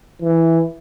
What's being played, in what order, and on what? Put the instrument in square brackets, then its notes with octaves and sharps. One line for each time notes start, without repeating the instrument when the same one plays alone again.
[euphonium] E3